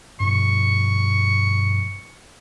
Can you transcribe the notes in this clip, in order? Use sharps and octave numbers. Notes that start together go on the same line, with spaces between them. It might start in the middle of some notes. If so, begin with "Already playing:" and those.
G2 B2 F3 C#6